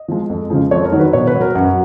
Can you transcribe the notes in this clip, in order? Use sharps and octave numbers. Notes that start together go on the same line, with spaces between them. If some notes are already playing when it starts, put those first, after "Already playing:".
Already playing: D#5
F3 G#3
F2
C#3 F3 G#3
F2 C#5
A#4
D#3 F#3
B4
B2 C#5
B4
F#3
A#4
F#2 F#4